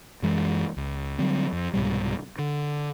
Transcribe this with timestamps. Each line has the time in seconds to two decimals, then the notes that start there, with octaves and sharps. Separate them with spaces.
0.22 F#2 E3 G#3
0.77 C#2
1.18 D3 F#3 G3 C4
1.52 F2
1.73 C2 G#2 B2 G3
2.39 D3